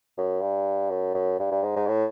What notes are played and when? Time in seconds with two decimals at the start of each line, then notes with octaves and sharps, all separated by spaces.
0.18 F#2
0.41 G2
0.90 F#2
1.14 F#2
1.39 G2
1.51 G2
1.63 G#2
1.76 G#2
1.88 A2